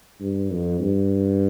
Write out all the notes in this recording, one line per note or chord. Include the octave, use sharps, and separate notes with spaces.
G2
F2
G2